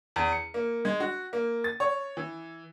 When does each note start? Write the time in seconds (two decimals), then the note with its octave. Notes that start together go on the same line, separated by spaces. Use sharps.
0.16 E2
0.32 C#7
0.54 A#3
0.85 G#3
1.00 F#4
1.33 A#3
1.64 A6
1.80 C#5
2.17 E3